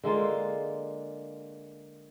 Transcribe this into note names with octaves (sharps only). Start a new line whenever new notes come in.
D3 G#3 A#3 F4